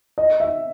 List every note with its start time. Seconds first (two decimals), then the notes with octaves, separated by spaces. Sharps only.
0.18 D#5
0.40 E5